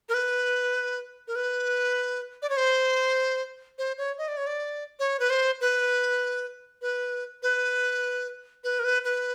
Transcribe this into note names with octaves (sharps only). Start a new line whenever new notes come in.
A#4
B4
A#4
B4
D5
C#5
C5
C5
C#5
D#5
D5
C#5
D5
C#5
B4
C5
B4
B4
B4
B4
A#4
B4
B4